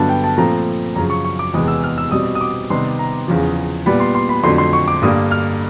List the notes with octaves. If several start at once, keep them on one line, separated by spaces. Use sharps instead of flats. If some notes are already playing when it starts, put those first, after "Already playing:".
Already playing: G2 D3 F#3 B3 A5
G5
A5
A#2 F3 A3 C4 A#5
F#2 C#3 F3 A#5
C#6
C#6
D6
E2 C3 E3 G#3 B3 D#6
E6
F6
E6
B2 G3 C4 D#6
D#6
D6
C3 D#3 G3 B3 C6
A#5
E2 C#3 F3
A#2 G3 B3 B5
C6
C6
B5
F2 D3 F#3 A3 C4 C6
C6
C#6
D6
G2 D3 G3 A#3 D#6
F6